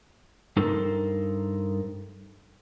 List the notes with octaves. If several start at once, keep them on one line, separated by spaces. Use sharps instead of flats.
G2 D#4 A4 A#4 C5